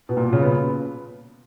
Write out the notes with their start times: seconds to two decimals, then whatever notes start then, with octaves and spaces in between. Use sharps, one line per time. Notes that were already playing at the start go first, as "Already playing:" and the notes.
0.09 B2
0.17 A#2
0.23 B2
0.33 C#3
0.42 B3